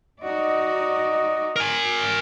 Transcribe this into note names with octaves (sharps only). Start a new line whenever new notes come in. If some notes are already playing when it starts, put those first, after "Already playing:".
D#4 F#4 D5 D#5
A#4 G#5